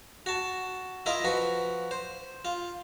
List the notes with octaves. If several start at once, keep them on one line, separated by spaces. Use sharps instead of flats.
F#4 A5
E4 F4 A#4 D#5
F3 F#4 B4
C5
F4